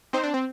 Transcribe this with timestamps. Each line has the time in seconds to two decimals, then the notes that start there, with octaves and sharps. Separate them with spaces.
0.13 C4 D#4 C5
0.24 D4
0.34 C4